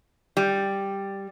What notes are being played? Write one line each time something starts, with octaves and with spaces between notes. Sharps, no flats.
G3